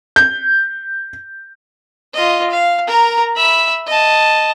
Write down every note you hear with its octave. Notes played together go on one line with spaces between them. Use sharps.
G6
F4 D#5
F5
A#4 A#5
E5 B5
D#5 A5